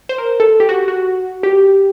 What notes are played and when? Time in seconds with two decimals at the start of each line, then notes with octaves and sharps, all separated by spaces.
0.09 C5
0.18 A#4
0.40 A4
0.60 G4
0.69 F#4
0.88 F#4
1.43 G4